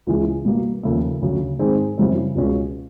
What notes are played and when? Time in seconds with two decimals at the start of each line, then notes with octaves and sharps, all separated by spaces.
0.07 C#2 C#3 E3 G#3
0.45 B2 G3 A#3
0.83 D#2 C#3 F3 A3
1.21 D2 C#3 F#3
1.59 G#2 D#3 G#3 C4
1.98 F#2 C#3 E3 G3 C4
2.35 C#2 B2 G#3 C#4 F4